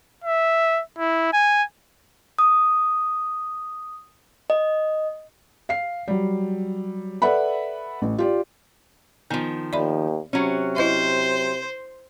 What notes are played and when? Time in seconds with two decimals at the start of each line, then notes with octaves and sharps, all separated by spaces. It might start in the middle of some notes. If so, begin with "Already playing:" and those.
0.24 E5
0.99 E4
1.33 G#5
2.39 D#6
4.50 D#5
5.69 F5 C7
6.08 F#3 G3
7.22 A4 B4 D5 E5 F#5 B5
8.02 A1
8.18 F4 G4 D5
9.30 D#3 F3 B3
9.73 D#2 D5 E5 B5
10.33 C3 F#3 C#4
10.76 E4 C5 D#5 E5